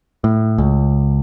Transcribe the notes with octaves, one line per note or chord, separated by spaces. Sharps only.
A2
C#2